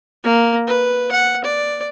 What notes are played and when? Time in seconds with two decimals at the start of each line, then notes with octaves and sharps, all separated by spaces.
0.24 A#3
0.67 B4
1.12 F#5
1.44 D5